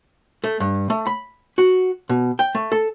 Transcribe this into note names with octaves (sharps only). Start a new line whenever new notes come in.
A3
G2
A3
B5
F#4
B2
G5
A3
A4